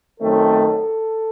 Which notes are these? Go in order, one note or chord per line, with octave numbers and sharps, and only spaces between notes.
F#2 D#3 A3 C4 A4